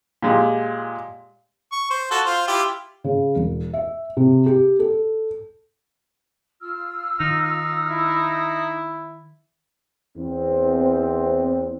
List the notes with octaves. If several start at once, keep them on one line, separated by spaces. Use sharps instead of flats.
A#2 G#3 G4
C#6
C5
F4 F#4 A4
F4 C5
E4 F4 G4
C#3
E1
E5
C3
G4
A4
F4 E6 F6
D#3 D#4
E4
E2 C4